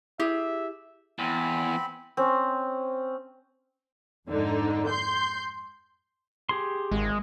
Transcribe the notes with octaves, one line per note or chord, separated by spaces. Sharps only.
E4 G4 G#4 E5
E2 C4 B5
C4 C#4
F2 G#2 D3 D#4
C6 G6
G4 G#4 C6
G#1 G#3